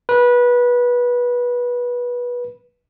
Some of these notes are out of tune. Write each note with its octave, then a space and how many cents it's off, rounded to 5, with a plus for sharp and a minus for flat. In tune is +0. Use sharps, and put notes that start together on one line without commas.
B4 -20